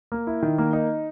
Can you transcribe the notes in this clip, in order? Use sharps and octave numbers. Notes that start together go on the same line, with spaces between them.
A#3
E4
D#3
A#3
D#4